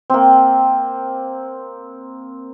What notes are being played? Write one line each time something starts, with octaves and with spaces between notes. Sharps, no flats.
A#3 C4